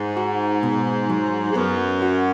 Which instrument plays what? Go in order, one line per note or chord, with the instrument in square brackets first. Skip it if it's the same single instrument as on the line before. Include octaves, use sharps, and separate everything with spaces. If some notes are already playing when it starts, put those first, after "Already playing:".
Already playing: [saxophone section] G#2
[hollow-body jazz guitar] F#4
B2
F#3
[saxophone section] G#2
[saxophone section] F#2 [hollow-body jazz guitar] B3
[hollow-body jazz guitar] F#4